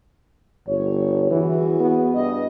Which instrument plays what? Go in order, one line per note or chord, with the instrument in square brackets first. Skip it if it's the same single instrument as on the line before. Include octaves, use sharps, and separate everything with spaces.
[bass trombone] G1 [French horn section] C#5
[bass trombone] E3 [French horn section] E4 F#4 G#4
[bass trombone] B3
[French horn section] G2 D#5